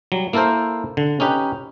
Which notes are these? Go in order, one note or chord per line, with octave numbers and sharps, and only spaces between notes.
F#3 G3
A#3 E4 A4 A#4 C5
D3
C#4 D#4 G4 B4